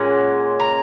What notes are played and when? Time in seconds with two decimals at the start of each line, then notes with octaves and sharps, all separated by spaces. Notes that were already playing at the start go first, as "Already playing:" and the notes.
Already playing: A#2 G#3 C#4 F#5
0.60 A#5